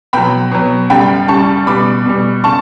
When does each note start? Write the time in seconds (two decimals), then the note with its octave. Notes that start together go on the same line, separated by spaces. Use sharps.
0.13 B2 F#3 G5 B5
0.52 B2 F#3
0.90 F#2 C#3 G3 G5 B5
1.28 F#2 C#3 G3 A5 C#6
1.67 B2 G3 B5 D6
2.06 B2 G3
2.44 C#3 A5 C#6